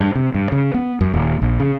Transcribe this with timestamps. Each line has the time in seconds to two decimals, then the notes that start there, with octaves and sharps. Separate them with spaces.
0.01 G2
0.15 C3
0.34 G2
0.52 C#3
0.74 B3
1.01 F#2
1.14 D#1
1.42 A#1
1.60 C#3